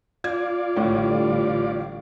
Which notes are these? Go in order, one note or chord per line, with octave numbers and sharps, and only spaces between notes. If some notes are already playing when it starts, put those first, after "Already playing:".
F4 D5 G#6
A1 A2 D3 G3